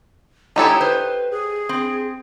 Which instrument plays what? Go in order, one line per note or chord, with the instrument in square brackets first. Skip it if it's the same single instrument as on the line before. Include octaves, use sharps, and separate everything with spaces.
[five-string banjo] D#4 G4 A4 [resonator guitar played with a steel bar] E4 A#5 [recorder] C#5
[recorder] B4 [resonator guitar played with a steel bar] C5
[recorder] G#4
[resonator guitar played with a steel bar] C4